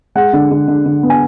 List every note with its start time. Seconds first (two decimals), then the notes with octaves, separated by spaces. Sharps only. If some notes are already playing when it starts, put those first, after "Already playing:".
0.15 G#3 F#5
0.33 D3
0.51 D3
0.68 D3
0.86 D3
1.03 B3
1.10 G#5